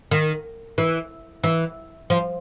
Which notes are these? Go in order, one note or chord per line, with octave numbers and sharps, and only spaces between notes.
D#3
E3
E3
F3